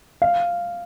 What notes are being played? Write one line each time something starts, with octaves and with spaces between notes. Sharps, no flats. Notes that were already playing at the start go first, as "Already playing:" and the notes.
F5